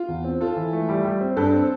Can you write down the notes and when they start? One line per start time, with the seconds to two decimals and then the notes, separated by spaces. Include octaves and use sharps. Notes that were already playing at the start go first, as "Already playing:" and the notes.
Already playing: F4
0.08 E2
0.24 C4
0.41 F4 A4
0.56 E3
0.73 A3
0.89 G3
1.04 G3
1.21 C4
1.37 G2 A4
1.53 C4